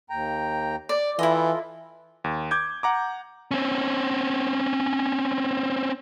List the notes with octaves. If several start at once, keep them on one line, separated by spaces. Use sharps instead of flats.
D#2 G5 A#5
D5
E3 E4 F4 A4 D#5
D#2
D6 G6 G#6
F#5 A#5 D6
C4 C#4